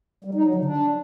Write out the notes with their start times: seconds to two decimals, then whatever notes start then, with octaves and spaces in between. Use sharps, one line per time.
0.24 G3
0.35 D#4
0.45 F#3
0.55 D3
0.65 D4